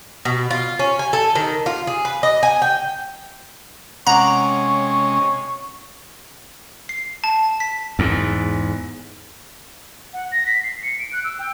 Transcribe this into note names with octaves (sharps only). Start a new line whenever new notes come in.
B2
F4
C#4
G#5
A4
D#3
F4
G#4
B4
D#5
G#5
G5
C3 G#3 C#4 C#5 F#5 A#5 D6
C7
A5
B6
E2 G#2
F#5
A#6
B6
C7
C#7
D7
F#6
E6
G5